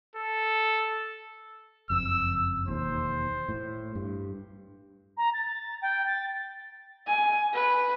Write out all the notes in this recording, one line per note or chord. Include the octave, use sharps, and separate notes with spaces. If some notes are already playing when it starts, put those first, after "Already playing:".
A4
F#1 F2 E6
E1 D#2 C5
A2
G2
A#5
A6
A6
G5
A6
G#5
B4